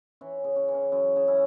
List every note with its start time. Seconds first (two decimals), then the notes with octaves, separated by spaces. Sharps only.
0.21 E3 C#4
0.44 C#3
0.56 C#4
0.68 E3
0.74 C#4
0.92 F#2 C#4
1.16 C#3
1.28 C#4 E4